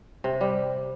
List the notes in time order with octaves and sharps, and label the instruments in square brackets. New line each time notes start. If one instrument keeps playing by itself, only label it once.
[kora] C3
G3